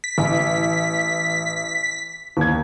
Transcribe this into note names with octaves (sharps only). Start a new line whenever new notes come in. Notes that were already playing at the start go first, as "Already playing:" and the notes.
B6
A1
D#2 G#6